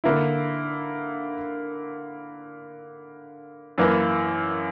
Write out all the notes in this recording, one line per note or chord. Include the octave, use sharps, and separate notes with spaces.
D3 A#3 E4
F#2 E3 A#3